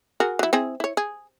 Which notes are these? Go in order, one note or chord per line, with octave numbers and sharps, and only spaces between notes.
F#4 G#4 A#4
F#3 E4
C4 E4 G#4
E4 C#5
G#4